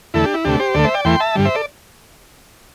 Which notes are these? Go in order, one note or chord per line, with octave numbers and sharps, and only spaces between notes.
E2 D3 A3 E4 A4
D4 G4
E4
D2 C3 A3 D4 G4
G4 C5
D2 D3 A3 A4 D5
C5 E5
D5 G5
E2 E3 A3 G5 C6
E5 A5
G2 D3 G3
C5 E5
A4 D5